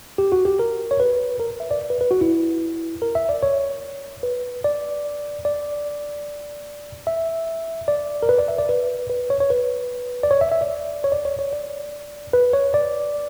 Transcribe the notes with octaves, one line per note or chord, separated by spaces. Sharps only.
G4
F#4
G4
A#4
C#5
B4
A#4
E5
D5
B4
B4
F#4
E4
A#4
E5
D5
C#5
B4
D5
D5
E5
D5
A#4
B4
D5
E5
D5
B4
B4
C#5
C#5
B4
D5
C#5
E5
E5
D5
C#5
D5
C#5
C#5
D5
B4
C#5
D5